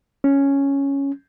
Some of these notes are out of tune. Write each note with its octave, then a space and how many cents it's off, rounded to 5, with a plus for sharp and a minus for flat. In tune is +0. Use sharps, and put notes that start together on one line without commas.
C#4 +0